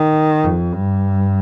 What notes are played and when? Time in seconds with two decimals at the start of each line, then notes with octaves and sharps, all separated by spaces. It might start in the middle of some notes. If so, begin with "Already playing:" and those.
Already playing: D#3
0.44 F2
0.74 G2